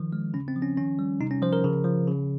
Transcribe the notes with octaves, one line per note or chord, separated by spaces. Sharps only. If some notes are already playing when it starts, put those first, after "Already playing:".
Already playing: D#3 F3
G#3
C#3 C#4
C4
F3
C#4
D#3 C#4
G3
C3 D#4
C#4
F3 C5
A#4
C#3
F3
C#3